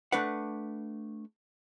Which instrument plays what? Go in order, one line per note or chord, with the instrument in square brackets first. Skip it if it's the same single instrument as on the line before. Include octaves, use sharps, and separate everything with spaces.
[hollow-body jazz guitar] A3 D4 B4 F#5